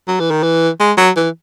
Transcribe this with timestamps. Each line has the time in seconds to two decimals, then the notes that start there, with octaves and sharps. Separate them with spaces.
0.08 F#3
0.20 E3
0.31 D#3
0.43 E3
0.80 G#3
0.98 F#3
1.16 E3